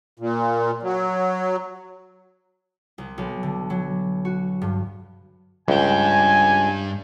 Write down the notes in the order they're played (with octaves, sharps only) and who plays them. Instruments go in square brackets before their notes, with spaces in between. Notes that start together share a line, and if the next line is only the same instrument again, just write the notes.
[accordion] A#2
F#3
[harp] C2
B1
D3
F#3
F#4
G2
[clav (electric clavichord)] C#2 [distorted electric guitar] G2 G5 [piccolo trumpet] G#5